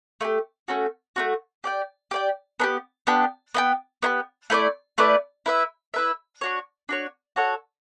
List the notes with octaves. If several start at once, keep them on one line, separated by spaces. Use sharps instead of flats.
A3 E4 G4
A3 C#4 F#4
A3 C#4 F#4
G4 D5 G5
G4 D5 G5
B3 D4 G4
B3 D4 G4
B3 E4 G4
B3 E4 G4
A3 E4 B4 D5
A3 E4 B4 D5
E4 B4 E5
E4 B4 E5
D4 F#4 C#5
D4 F#4 C#5
F#4 A4 C#5 F#5